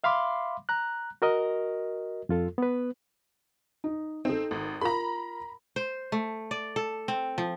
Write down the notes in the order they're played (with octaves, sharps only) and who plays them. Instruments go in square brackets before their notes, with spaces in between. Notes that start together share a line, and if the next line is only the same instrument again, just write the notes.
[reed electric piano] E5 F5 B5 C6 D6
A#5 F#6
F#4 A#4 D#5
F2 F4 A4
B3 B4
[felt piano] D#4
[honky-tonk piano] C4 [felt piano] D#4 A4
[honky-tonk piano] G#1
[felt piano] F4 A#4 [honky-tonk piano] A#5 B5
[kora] C5
A3
D5
A4
C4
F3